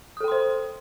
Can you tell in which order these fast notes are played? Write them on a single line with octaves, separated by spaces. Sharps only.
D#6 A4 G5 C6 C5